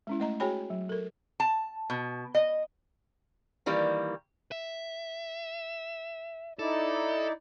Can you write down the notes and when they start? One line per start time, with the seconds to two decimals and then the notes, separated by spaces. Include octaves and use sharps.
0.07 G#3 C#4 E4
0.20 A3 D#5 A#5
0.40 F#4 G#4 C#5 G5 G#5 B5
0.70 F#3
0.89 A4 A#4
1.40 A5
1.90 B2
2.35 D#5
3.66 D#3 E3 G3 A#3
4.52 E5
6.59 D#4 E4 A4 D5